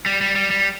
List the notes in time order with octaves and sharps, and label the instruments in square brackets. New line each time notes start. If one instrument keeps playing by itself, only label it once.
[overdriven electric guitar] G3
G3
G3
G3